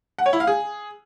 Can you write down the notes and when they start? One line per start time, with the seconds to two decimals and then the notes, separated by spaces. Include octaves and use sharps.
0.19 F#5
0.26 C#5
0.33 E4
0.40 F5
0.47 G#4